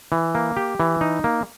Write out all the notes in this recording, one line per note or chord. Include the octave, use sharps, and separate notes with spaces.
E3
A#3
G4
E3
D#4
A#3